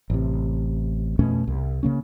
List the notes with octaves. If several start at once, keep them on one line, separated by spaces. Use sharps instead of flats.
A1 A2 C3
F2 B2 A3 C#4
C2
C#3 A#3 C#4